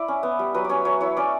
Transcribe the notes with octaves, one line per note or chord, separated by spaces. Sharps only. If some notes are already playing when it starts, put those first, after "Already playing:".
Already playing: E4 D5
C#4
B3
G3
F#3 B4
D5
C#4 C#5
F#3 C#5
E4 C#5
C#4 D5